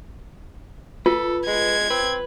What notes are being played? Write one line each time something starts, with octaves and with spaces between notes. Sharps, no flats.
F4 A4 B4
G#3 G#6
C4 B4